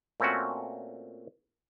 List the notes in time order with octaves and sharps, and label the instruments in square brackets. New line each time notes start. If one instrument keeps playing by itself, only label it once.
[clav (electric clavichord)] A#2 A3 C4 C#4 F#4